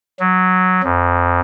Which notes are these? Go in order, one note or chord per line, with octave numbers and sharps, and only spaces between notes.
F#3
F2